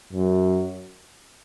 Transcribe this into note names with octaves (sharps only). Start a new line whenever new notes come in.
F#2